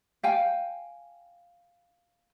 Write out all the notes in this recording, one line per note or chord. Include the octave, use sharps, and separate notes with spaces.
F5 G5 G#5